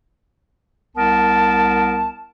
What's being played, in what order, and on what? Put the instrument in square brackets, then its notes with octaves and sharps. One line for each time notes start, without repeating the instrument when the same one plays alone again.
[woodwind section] C2 B3 A#4 A5